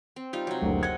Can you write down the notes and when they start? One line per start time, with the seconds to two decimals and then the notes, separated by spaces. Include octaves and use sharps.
0.16 C4
0.33 G3 D#4 F4
0.47 C3 F#3
0.62 F#1 D2
0.83 D#5 F#5 G#6